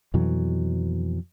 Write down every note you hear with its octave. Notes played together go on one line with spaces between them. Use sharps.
F2 B2 E3 F#3